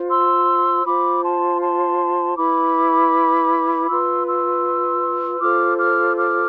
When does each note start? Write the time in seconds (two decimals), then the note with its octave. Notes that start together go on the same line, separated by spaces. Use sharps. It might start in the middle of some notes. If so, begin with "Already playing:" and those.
Already playing: F4 C5
0.10 C6 E6
0.86 F4 C5 B5 D6
1.23 A5 C6
1.61 A5 C6
2.37 E4 B4 B5 D6
3.89 F4 B4 C6 E6
4.27 C6 E6
5.40 F4 A4 C5 D6 F6
5.79 D6 F6
6.16 D6 F6